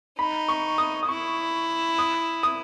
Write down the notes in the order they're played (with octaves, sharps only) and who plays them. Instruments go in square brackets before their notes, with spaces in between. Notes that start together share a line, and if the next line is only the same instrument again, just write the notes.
[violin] D#4 [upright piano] B5
[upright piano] C#6
D#6
D#6
[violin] E4 [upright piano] C#6
[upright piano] D#6
D#6